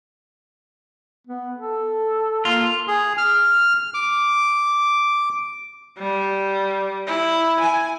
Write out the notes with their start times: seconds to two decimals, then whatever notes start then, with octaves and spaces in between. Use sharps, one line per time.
1.27 B3
1.58 A4
2.45 A#3 F4
2.88 G#4
3.18 F6
3.94 D6
5.98 G3
7.07 E4
7.60 G#5